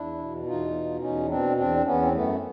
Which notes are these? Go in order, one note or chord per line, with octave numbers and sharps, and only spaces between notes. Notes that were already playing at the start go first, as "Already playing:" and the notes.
Already playing: E2 D4 E4
B2
E2 D#4 F4
B2
E2 C#4 D#4
B2 C4 D4
E2 C4 D4
E2 B3 C#4
C4
F#2 A3 B3